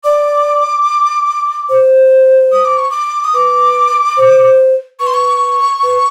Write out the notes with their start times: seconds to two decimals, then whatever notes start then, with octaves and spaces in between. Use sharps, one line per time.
0.04 D5 D6
1.69 C5
2.52 D#6
2.65 D6
2.77 C#6
2.91 D6
3.24 D#6
3.34 B4 D6
4.17 C5
5.00 B4 C#6
5.07 C6
5.14 C#6
5.83 B4